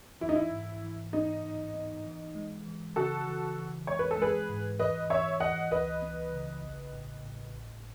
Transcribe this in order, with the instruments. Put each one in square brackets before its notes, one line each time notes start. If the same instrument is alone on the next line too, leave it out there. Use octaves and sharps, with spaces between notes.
[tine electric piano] E3 [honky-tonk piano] E4
[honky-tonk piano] D#4
E4
[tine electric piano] G#2
E3
[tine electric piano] B3 [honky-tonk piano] D#4
[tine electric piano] A2
B3
E3
G#3
E3
[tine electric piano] C#3 [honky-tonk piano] F#4 A4
[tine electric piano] E3
E3
[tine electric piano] G#3 [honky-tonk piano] C#5
[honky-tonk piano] B4
A4
[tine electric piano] G#3 [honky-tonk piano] G#4 B4
[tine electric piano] G#2
[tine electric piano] E3 [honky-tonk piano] B4 D#5
[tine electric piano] E3 [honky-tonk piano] C#5 E5
[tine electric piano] E3 [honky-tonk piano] D#5 F#5
[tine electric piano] C#2 [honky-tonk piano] B4 D#5
[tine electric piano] B3
C#3
A1
A2
A2
G#1